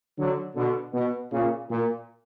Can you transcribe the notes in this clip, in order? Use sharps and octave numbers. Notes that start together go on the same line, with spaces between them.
D3 F#3
B2 D3
B2
A#2 C#3
A#2